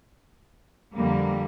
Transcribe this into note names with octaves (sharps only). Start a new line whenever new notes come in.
F2 D3 G3 A#3